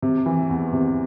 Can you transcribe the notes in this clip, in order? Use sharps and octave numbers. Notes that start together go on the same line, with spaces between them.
C3
E3
E2
C3